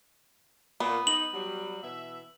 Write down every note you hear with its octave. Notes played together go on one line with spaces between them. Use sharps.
A#2 B3
D#4 F#7
F#3 G3
B2 E3 E5